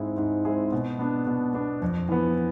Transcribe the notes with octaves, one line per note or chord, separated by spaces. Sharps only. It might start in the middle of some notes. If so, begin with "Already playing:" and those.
Already playing: G#2 G#3 C4 E4 G#4
G#2
G#3 C4 E4 G#4
B2
B3 D4
B2
B3 D4
F2
E3 B3